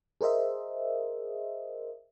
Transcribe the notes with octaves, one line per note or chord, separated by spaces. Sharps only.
G#4 A#4 C5 D#5 E5